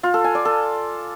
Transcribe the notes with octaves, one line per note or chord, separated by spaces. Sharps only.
F4
A4
G#5
D5
A4